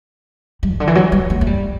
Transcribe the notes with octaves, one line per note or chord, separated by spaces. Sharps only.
G3
C#3
D3
E3
F#3
G3
A3
A3
G3